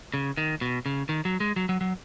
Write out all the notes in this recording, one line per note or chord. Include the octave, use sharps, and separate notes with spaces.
C#3
D#3
B2
C#3
D#3
F#3
G#3
F#3
F#3
F#3